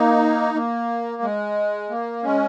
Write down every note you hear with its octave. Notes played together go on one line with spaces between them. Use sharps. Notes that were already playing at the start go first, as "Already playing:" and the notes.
Already playing: A#3 D#4
A#3
G#3
A#3
G#3 C#4